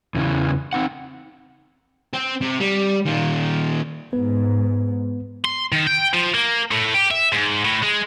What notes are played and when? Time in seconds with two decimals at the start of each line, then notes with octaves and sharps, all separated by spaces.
0.15 E2 C#3 E3
0.73 C4 D#4 F#5
2.13 C4
2.41 C3
2.60 G3
3.06 A#2 D#3
4.13 G#2 B3 B4
5.45 C6
5.72 D#3
5.87 G5
6.14 F3
6.35 A#3
6.71 A2
6.94 G4
7.11 E5
7.32 G#2
7.64 A2
7.82 G#3